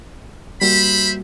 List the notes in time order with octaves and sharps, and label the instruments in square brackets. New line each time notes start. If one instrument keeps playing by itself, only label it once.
[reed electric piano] G3 A#3 F#4 [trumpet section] C5 E5 B5